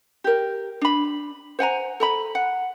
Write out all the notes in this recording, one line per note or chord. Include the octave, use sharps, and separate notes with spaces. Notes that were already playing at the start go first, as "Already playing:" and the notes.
G4 A#4
D4 B5
C5 F#5 G#5 A#5
A4 A#5 B5
F#5